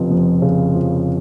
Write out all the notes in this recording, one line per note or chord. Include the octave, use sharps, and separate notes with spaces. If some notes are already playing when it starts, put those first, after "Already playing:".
Already playing: F1 F2 C#3 F3
F2
C#3
F3